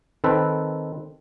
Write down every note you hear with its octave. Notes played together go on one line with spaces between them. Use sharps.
D#3 C4 A4 B4